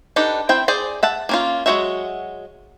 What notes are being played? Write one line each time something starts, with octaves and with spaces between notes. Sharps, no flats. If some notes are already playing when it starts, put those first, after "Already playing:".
D4 D#4 G4 A4 B4
C4 E4 C5 G5
G#4 C5 D5
E5 F#5 A5
A#3 C#4 F4
F#3 G#3 F#4 C#5 E5